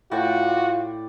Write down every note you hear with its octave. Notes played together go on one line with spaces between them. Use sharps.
A2 F4 F#4 D5 G5